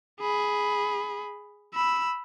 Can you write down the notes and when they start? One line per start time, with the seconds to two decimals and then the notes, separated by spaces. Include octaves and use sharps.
0.21 G#4 B5
1.74 B5 E6